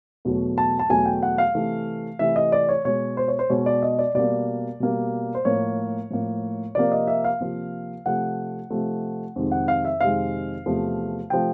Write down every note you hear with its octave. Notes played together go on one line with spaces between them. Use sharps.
E2 B2 F#3 A3
A5
A5
E2 B2 F#3 A3 G#5
G5
F#5
F5
C3 E3 A3
C3 E3 A3 E5
D#5
D5
C#5
B2 G#3 C#5
C5
C#5
C5
B2 G#3 C#5
D5
D#5
D5
B2 G3 A#3 D5
B2 G3 A#3
C5
A2 F3 A#3 C#5
A2 F3 A#3
C3 F3 A#3 D5
D#5
E5
F5
C3 F3 A#3
C3 F3 A3 F#5
C3 F3 A3
F2 C3 D#3 G#3
F#5
F5
E5
F2 C3 D#3 G#3 F5
E2 C3 F3 A3
C3 F3 A3 G5